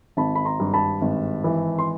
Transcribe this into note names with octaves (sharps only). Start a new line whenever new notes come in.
G#1 A5 B5
B5
A#5 C6
G2
A5 B5
G#1
E3
C6